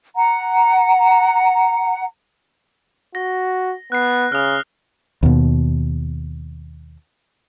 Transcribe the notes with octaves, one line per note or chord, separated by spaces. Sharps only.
F#5 A#5
F#4 A#6
B3 F#6 C7
C#3 D#6 F6
D#2 B2